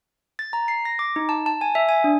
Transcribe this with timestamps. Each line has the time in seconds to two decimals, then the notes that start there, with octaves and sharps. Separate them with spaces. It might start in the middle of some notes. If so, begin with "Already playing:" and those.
0.39 A6
0.53 A#5
0.68 C7
0.85 A#6
0.99 D6
1.16 D#4
1.29 A5
1.46 A5
1.61 G#5
1.75 E5
1.89 G#5
2.04 D4